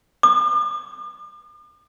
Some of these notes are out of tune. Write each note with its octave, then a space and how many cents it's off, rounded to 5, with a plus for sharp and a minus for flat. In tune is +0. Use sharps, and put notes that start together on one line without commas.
D6 +45